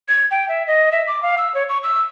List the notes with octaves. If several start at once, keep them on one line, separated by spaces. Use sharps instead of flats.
G#6
G5
E5
D#5
E5
D6
F5
E6
C#5
C#6
E6